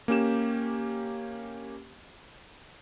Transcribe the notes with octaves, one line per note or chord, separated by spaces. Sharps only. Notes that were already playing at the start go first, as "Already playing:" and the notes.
A#3 C#4 G4 E7